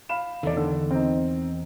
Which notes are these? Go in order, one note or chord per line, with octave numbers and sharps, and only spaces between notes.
F5 B5 E7
E2 D#3 A4 D5
D3 A4
C4 D#4